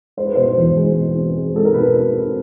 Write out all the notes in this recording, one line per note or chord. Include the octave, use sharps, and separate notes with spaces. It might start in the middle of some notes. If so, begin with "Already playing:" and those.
G#3 C5
B4
B2 C5
E2
G#3
B2
C4
G#3
G#3 A4
A#4
B2 B4
C4
C4